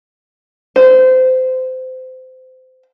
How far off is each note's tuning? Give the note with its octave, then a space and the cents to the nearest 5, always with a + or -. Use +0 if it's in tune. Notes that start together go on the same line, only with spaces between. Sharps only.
C5 -25